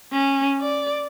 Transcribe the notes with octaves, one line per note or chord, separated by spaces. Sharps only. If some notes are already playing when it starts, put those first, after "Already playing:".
C#4
D5